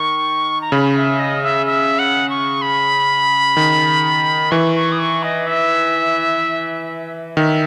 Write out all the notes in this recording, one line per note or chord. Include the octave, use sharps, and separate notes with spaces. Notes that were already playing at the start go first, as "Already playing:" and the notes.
Already playing: D#3 C#6
A#5
C#3 B5
E5
D#5
E5
E5
F#5
C#6
B5
D#3
E3 C#6
C#6
D#6
C#6
D#5
E5
D#3 E5